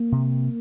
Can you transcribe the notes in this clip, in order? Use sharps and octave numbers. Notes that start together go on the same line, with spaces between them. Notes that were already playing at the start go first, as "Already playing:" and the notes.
Already playing: A#3
C3